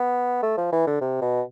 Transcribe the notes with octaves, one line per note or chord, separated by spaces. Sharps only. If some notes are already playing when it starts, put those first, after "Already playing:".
Already playing: B3
A3
F3
E3
D3
C3
B2